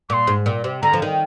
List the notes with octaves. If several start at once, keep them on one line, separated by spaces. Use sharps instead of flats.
A#2 C6 D6
G#2
A#2
C3
D3 A#5
F3
D#3